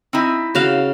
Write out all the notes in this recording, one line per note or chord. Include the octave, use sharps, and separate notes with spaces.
C4 D#4 E4
C#3 F#4 F5